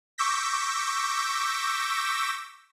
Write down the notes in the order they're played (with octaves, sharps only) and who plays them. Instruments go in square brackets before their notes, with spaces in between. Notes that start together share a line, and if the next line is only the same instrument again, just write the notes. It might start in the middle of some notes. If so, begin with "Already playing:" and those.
[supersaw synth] C#6 D6 E6 G6 A#6 B6